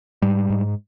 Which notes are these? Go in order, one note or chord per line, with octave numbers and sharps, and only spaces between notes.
G#2 G3
G#2